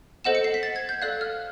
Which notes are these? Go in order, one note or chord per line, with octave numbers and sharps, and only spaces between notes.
A4 C5 D#5 F#5 E7
C#7
C7
B6
A6
G#6
G6
A4 D5 F5 F#6
F6